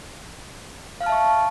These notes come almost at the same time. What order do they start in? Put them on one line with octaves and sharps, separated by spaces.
F5 F6 A5 E5 C#6